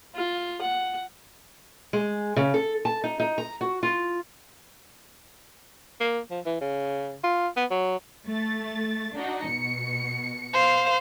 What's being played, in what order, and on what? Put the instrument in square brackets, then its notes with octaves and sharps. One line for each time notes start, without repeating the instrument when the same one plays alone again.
[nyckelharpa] F4
F#5
[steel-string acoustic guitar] G#3
C#3
A4
A5
D#4
D#4
A#5
F#4
F4
[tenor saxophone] A#3
F3
E3
C#3
F4
B3
F#3
[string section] A3 A6
D4 D#4 F#4
B2 C#7
[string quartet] C5 F5